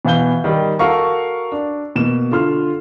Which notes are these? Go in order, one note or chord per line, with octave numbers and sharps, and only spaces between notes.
B2 E3 B3 F5 G6 G7
D#3 G3
F#4 A4 A#4 F5 A#5 C#6
D4
B2 A#3 E7
D3 F4 C6 F6